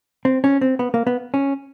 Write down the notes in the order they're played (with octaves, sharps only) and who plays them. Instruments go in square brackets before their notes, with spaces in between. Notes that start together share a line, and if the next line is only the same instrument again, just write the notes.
[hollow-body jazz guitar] C4
C#4
C4
B3
A#3
B3
C#4